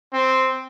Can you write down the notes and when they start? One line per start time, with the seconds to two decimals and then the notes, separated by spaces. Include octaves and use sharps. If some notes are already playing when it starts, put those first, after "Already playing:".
0.13 C4